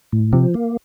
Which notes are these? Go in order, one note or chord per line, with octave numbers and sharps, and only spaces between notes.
A2
C3 F3
A#3